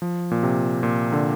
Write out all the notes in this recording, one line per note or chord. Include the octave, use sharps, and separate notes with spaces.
F3
A#2
C3
A#2
D3